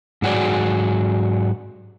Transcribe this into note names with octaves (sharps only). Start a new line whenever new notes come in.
G#2 F#3 F#4 G#4 D5